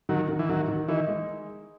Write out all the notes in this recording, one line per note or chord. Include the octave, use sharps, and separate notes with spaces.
D#3 F#3
D#3
E3
D#3 F#3
D#3
E3 D#4
G#3